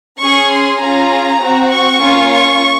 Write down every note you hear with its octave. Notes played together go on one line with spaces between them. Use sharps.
C#4 G#4 C#6
C6
C#4 F4 G#4 A#5
C4 F#4
C#6
A#3 C#4 F4
C#6